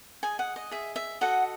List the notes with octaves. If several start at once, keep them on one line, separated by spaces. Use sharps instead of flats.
G#4 D#5 G#5
F#5
D#5
G#4 D#5 E5
E5
F#4 A4 D#5 F#5